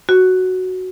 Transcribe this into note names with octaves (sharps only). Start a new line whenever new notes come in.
F#4